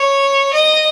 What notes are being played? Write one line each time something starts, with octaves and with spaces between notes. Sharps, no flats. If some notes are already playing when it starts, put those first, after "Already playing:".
Already playing: C#5
D#5